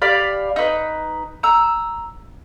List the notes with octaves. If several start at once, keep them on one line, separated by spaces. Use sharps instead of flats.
G4 D5 F5 B5
D#4 B4
A#5 E6